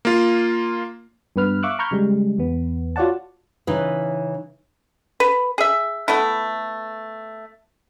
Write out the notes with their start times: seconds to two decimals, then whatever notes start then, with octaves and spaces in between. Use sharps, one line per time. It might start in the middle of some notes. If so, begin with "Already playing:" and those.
0.05 A#3 F4
1.36 G2 B3 B4 F6
1.63 E5 F5 C#6 D6 E6 F#6
1.79 A#5 B5 C#6 F6 G6 G#6
1.91 C#3 G3 G#3
2.38 E2 B3
2.96 F4 F#4 C#5 D5 F#5 A5
3.67 C#3 E3 D#4 B4
5.20 B4
5.58 G#4 E5
6.08 A3 B3 E4